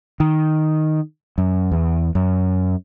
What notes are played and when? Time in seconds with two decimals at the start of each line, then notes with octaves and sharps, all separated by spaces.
0.20 D#3
1.38 F#2
1.71 E2
2.15 F#2